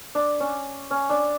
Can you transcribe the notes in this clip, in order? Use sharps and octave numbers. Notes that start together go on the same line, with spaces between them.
D4
C#4
C#4
D4